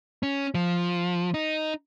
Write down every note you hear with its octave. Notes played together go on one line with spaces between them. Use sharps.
C#4
F3
D#4